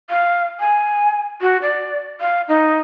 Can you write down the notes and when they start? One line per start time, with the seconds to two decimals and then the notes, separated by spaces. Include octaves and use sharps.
0.10 F5
0.60 G#5
1.41 F#4
1.62 D5
2.21 F5
2.49 D#4